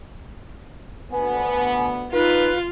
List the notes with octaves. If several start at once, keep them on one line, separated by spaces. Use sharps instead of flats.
D2 B3 G#5
D#4 F4 B4